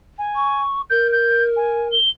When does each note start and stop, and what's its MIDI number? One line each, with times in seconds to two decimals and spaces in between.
0.18 0.63 80
0.35 0.81 85
0.90 1.95 70
0.90 1.08 91
1.12 1.43 91
1.56 1.88 80
1.91 2.08 103